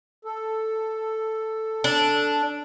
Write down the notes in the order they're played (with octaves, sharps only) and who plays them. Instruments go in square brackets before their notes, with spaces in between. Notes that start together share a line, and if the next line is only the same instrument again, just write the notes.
[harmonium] A4
[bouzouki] D4